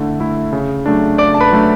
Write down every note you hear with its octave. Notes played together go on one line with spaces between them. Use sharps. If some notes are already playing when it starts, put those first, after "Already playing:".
Already playing: D3 A3 E4
A3 E4
C#3
F#3 A3 D4
C#3 D5 D6
A5
B4 B5
F#3 A3 D4